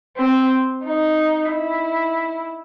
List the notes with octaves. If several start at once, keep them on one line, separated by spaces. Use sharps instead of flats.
C4
D#4
E4